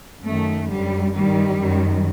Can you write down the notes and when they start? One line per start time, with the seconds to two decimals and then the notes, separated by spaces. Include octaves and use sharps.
0.25 F#2 D#3 A3
0.70 F#2 D3 G3
1.15 G2 D#3 G3
1.60 F#2 D#3